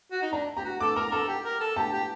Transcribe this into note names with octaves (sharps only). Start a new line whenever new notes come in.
F#4
D#4
D4 A#5
G4 A#5
F#4
A4 D6
A#4 A#5
A4 A#5
G4
A#4
A4
G4 A5
G4